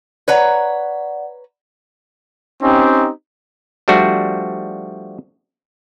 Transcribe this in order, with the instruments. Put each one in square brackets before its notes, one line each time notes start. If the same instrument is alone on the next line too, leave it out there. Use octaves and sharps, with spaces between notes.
[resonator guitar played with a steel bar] B4 C#5 A#5 [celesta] D5 F#5
[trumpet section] C4 C#4 D#4 G4
[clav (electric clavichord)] F3 G3 A3 D4 F#4